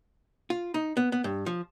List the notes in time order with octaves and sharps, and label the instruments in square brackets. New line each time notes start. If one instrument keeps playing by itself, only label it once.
[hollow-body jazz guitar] F4
D#4
B3
B3
G2
F3